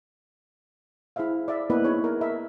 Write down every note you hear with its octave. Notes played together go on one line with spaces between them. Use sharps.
E4 G#4 C5 E5 F5
D5 E5
A#3 B3 E4 B4 D#5 E5
D#4 E4 G#4 C#5
A#4
A#4 D#5 E5